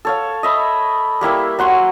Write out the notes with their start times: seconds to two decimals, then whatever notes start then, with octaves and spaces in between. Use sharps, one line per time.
0.05 A4 C#5 F5
0.43 D#5 E5 B5
1.21 G3 A#3 E4 E5
1.59 F#3 F#5 C6 C#6